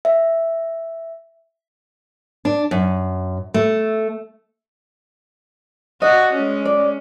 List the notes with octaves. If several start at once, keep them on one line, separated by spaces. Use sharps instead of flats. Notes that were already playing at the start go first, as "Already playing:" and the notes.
E5
D4
F#2
A3
D4 F#4 D#5
G#3 C#4
D5